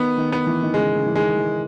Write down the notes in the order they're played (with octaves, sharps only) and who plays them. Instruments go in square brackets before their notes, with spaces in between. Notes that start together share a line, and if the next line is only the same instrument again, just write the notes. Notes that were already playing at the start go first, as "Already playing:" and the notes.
Already playing: [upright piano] D#3 [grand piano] B3
[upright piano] D#3
[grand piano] B3
[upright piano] E3
D#3
[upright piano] C#3 [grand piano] G#3
[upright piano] C#3
E3
[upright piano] D#3 [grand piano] G#3
[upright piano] E3